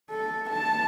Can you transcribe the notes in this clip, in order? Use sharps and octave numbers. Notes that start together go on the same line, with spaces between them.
A4
A5